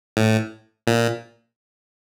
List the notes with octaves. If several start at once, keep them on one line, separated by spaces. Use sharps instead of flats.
A2
A#2